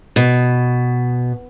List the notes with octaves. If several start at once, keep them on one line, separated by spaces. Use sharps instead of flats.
B2